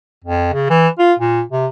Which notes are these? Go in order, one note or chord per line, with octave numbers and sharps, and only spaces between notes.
F2
C#3
E3
F4
A#2
C3